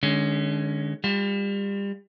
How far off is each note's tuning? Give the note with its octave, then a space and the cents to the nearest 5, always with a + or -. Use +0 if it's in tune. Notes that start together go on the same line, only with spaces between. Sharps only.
D3 +40 G#3 +0 C#4 +20
G3 +30 F4 +35